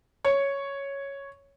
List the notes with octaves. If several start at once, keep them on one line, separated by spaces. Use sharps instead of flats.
C#5